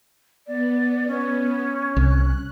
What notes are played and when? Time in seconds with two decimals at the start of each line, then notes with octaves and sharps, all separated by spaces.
0.47 B3 D5
1.07 C#4
1.96 C2 F#6